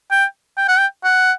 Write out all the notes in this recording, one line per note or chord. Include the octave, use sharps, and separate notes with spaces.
G5
G5
F#5
G5
F#5